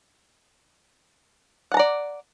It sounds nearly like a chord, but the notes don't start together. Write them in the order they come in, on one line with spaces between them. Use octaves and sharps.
F#5 A5 A#5 D5